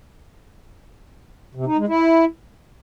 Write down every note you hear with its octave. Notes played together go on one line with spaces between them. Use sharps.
C3
D#4
G#3
E4